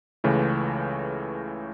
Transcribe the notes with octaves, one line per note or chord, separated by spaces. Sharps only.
C#2 C#3 E3 A3